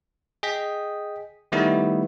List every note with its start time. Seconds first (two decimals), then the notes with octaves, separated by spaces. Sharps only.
0.43 G#4 D#5 G5 B6
1.52 D#3 G3 A3 B3 D#4 E4